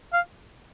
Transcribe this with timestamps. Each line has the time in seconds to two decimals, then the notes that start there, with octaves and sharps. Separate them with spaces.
0.13 F5